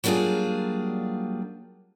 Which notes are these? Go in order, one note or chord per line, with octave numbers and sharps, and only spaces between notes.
F#3 G3 A#3 D4 F4 G#4